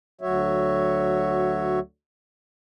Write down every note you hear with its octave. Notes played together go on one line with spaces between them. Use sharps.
D2 F#3 F#4 C#5 E5